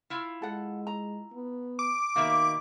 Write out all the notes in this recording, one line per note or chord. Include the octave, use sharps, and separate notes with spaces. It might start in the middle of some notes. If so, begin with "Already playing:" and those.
E4 F4
G#3 A4 F#5
A#5
B3
D6
B2 D#3 A#3 E5 F5